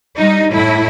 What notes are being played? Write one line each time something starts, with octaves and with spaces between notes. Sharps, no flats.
G3 D#4
A2 E4